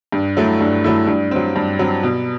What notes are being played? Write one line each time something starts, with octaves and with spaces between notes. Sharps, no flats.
G2
F#3 A3 E4
G2
F#3 A3 E4
G2
F#3 C4
G2
F#3 C4
B2